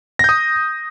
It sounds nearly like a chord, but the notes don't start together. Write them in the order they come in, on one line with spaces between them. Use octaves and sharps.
A#6 G6 D#6